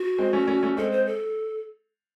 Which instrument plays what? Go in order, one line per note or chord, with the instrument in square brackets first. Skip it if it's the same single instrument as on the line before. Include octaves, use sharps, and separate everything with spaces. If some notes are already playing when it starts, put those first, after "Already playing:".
Already playing: [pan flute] F#4
[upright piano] G#3 C4
A3 C#4
A3 C#4
A3 C#4
[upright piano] G#3 C4 [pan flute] A4
[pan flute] C5
A4